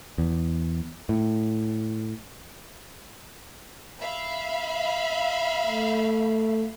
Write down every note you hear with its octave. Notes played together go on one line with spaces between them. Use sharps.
E2
A2
E5 F5 B5
A3